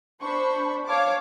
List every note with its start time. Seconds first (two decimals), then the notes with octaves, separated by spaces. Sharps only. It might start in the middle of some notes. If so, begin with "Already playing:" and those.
0.21 D4 C5 B5 C#6
0.86 C#5 F5 A5 D6